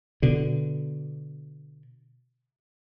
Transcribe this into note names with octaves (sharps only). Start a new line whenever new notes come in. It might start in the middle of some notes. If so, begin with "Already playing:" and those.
B2 D3